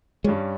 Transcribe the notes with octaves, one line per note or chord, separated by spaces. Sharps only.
G2 G3 G#3 C#4